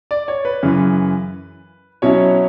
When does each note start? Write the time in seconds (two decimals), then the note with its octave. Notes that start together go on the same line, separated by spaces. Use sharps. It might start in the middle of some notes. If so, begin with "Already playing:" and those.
0.11 D5
0.28 C#5
0.45 B4
0.63 F#2 C#3 E3
2.02 B2 F#3 C#4 E4 C#5